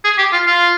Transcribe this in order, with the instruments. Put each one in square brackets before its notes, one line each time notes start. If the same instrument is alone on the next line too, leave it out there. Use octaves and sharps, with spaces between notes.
[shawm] G#4
G4
F4
F4